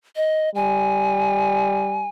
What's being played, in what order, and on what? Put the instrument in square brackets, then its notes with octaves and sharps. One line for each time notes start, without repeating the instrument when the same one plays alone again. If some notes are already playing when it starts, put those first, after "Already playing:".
[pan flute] D#5
[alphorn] G3 [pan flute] G#5